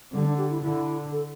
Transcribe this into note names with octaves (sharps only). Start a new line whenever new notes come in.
D3 G3
D4
G4
E4
D3 E4
A4